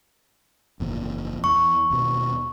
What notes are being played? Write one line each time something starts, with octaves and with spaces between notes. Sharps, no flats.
F#1 E2 A#2
E2 C#6
D#2 B2